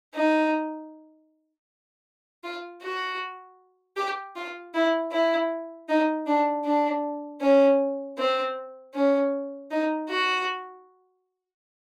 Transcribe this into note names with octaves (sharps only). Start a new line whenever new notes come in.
D#4
F4
F#4
G4
F4
E4
E4
D#4
D4
D4
C#4
C4
C#4
D#4
F#4